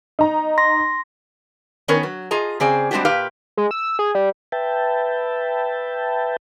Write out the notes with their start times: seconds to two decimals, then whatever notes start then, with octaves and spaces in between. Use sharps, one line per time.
0.19 D#4 A#5
0.58 C6 A#6
1.88 D#3 B3 C#4 A#4 B4 C#5
2.03 F#3
2.31 F4 G#4 D#5 A#5
2.60 C#3 C4 G#4 D5
2.91 G3 G#3 C4 D4 F#4 G4
3.05 A#2 G4 B4 F5
3.57 G#3
3.71 E6
3.99 G#4
4.15 G3
4.52 B4 E5 G5 A5